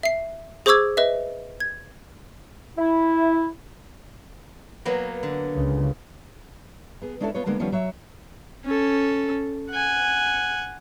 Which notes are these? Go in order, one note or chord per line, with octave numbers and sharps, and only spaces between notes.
E5 C7
G#4 C5 C#6 D6 E6 G#6
B4 D#5 E5
G#6
E4
F#3 A#3 B3
D3
C#2 C#3
B3 G#4
G#3 C#4 D4 E4 G4 A4
B3 F4 B4 C#5
D3 G#3 A#3 B3
D#3 F3 G3 B3 C#4 F4
F#3 C#5 E5
C#4 A4
F#5 G#5